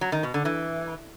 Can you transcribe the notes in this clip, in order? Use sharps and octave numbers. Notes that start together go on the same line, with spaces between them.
F#3
D#3
B2
D3
E3